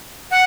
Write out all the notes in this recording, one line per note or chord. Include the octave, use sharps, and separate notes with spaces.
F#5